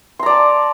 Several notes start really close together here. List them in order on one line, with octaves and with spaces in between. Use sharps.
C6 A#5 D5 A5